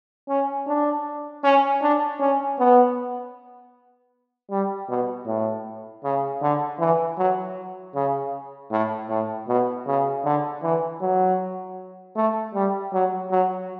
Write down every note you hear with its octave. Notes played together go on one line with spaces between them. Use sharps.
C#4
D4
C#4
D4
C#4
B3
G3
B2
A2
C#3
D3
E3
F#3
C#3
A2
A2
B2
C#3
D3
E3
F#3
A3
G3
F#3
F#3